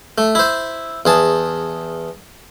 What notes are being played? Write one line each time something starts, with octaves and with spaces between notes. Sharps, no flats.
A3
E4 C5
E2 G#4 A5